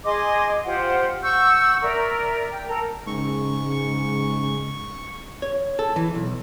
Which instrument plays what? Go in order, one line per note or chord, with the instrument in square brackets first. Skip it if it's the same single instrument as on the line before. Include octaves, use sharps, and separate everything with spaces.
[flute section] G#4 D#5 C6 D6
F4 G4 C5 F#5
F#5 C#6 E6 G6
A#4 D5 E5
G5
A4 A#4 A#5
[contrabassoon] G#2 [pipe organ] C#3 G#3 C#4 [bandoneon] C#6
[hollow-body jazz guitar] C#5
A4
E3
B1